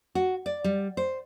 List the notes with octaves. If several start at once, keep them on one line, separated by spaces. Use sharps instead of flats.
F#4
D5
G3
C5